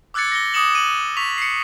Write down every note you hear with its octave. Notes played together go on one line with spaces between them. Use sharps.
D6 E6 F#6 G#6 A6 C#7
A#6 C#7 G7
D6 D#6 C#7 E7 F#7
D#7 F#7
C#6 B6 F7
C7 C#7